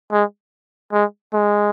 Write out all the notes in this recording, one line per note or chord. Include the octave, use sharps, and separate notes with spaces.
G#3
G#3
G#3